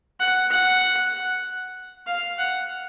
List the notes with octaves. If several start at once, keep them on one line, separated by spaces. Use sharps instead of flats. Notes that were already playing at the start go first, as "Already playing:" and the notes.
F#5
F#5
F5
F#5